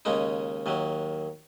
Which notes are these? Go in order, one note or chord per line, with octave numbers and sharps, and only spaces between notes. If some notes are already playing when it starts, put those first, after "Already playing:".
D#2 C#3 G#3 D#4
D#2 D#3 F#3